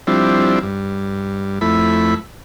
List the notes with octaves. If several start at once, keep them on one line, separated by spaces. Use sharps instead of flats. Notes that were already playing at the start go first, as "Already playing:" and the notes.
F3 G3 C4 D4 E4
G2
F2 A3 E4 B5